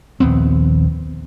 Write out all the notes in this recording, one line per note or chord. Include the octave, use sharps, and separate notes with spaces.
A#1 D#2 B3 C4